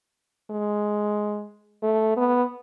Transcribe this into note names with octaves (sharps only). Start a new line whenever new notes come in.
G#3
A3
B3